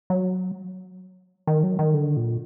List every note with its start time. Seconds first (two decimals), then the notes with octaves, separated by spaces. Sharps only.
0.10 F#3
1.47 D#3
1.63 F#3
1.79 D#3
1.94 D3
2.17 A#2